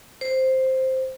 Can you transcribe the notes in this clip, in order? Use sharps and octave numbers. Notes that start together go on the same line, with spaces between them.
C5